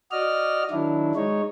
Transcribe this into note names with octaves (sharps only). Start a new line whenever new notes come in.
F#4 D5 D#5 F6
D#3 F#3 D4 E4
G#3 D#4 C#5